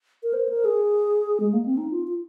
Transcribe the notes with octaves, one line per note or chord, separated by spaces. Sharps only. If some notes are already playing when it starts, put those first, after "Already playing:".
A#4
C5
A#4
G#4
G#3
A#3
C4
D#4
F4
F4